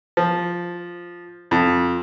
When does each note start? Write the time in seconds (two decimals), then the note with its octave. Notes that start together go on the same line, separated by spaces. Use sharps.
0.17 F3
1.51 F2